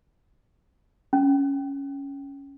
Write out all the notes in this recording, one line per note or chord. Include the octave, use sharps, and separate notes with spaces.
C#4